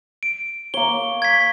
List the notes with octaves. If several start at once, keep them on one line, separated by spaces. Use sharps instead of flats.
D7
A#3 C#5 G7
G#6 B6